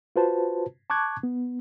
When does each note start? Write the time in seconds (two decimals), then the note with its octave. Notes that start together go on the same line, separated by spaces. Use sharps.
0.16 F4 F#4 B4 C5 A5
0.90 A5 C#6 D6 F#6 G#6
1.23 B3